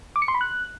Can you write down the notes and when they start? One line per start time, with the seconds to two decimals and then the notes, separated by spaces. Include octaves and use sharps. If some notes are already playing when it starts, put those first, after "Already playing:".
0.16 D6
0.22 C#7
0.28 C6
0.34 B5
0.41 F#6